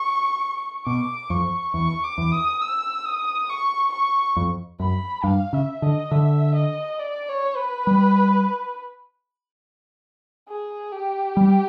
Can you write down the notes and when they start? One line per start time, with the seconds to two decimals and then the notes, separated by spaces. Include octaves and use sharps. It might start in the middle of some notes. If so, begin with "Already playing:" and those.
Already playing: C#6
0.86 B2 D6
1.30 F2 C#6
1.74 E2 C#6
2.04 D6
2.18 E2
2.32 D#6
2.61 E6
3.05 D#6
3.49 C#6
3.92 C#6
4.36 F2
4.80 F#2 B5
5.24 G2 F5
5.53 C#3 E5
5.82 D3 D#5
6.11 D3 E5
6.55 D#5
6.99 D5
7.28 C#5
7.57 B4
7.87 G3
10.48 G#4
10.92 G4
11.37 G3